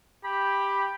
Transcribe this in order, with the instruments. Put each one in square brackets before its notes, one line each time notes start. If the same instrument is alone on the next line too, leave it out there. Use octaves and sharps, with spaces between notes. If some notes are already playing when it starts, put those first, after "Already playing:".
[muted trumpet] G4 [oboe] B5